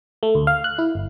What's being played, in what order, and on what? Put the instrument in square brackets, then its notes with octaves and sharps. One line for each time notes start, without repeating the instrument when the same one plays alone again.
[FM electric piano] A3
D2
F5
F#6
E4
G1